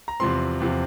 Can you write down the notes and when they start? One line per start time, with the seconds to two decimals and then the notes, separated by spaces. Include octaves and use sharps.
0.08 A#5
0.20 E2 C3 F3 C4 C6
0.60 E2 C3 F3 C4